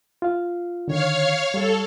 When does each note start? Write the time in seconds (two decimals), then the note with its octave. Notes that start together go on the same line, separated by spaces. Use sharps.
0.22 F4 F5
0.88 D3 D#3 C#5 F5 F6
1.54 G3 A4